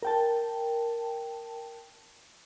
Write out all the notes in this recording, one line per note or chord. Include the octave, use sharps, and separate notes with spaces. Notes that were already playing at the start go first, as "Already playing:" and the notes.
A#4 G5 A5